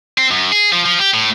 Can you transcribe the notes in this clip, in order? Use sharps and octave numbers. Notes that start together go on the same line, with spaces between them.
C4
F#2
G#4
F3
F3
G4
A2